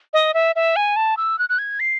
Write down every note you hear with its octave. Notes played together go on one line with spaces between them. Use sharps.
D#5
E5
E5
G#5
A5
E6
F#6
F#6
G#6
C7